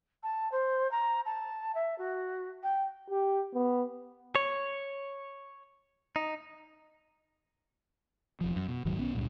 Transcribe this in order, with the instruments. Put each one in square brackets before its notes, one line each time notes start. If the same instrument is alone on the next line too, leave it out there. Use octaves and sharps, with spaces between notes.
[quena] A5
C5
A#5
A5
E5
F#4
G5
[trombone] G4
B3
[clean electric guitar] C#5
D#4
[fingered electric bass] E1 F3
F#2
B2
D#1 G#2 D#3 F#3
B1 B3 C#4
C#2 G2 A#2